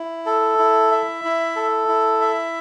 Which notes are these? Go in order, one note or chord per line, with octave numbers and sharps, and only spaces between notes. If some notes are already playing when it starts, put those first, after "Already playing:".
Already playing: E4
A4
E4
E5
E4
A4
E4
E5